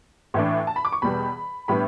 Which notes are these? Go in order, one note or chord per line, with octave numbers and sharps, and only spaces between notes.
A2 E3 A3 D4
A5
B5
D6
C#6
E2 B2 G3 B3 B5
A2 G3 B3 D4 B5